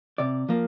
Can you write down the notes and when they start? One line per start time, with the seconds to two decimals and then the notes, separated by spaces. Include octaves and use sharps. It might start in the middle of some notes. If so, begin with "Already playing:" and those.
0.18 C3 D5
0.49 F3 A#3